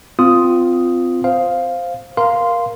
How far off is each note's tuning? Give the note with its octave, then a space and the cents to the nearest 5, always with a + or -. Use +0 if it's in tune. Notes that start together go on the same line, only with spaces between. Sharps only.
C4 -25 F4 +0 D#6 +5
C5 +0 F5 +0
A#4 +15 F5 +0 C6 -10